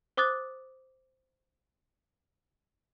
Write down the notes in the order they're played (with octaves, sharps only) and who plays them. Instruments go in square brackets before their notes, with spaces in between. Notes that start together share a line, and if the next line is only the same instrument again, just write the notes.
[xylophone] C5 D6 D#6 F#6 A6